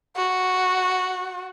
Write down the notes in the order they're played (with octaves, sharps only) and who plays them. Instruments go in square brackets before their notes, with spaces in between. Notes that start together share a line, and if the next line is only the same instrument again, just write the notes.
[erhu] F#4